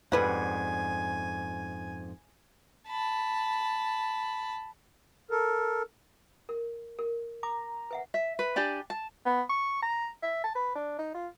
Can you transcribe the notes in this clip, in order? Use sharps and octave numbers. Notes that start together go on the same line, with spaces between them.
F2 G#2 G3 B4 F#5 G#5
A5 B5
A4 A#4
A#4
A#4
A#5 D6
B4 E5 F#5
E5
B4
D4 G4 D5 G#5
A5
B3
C#6
A#5
E5
A5
B4
D4
D#4
F4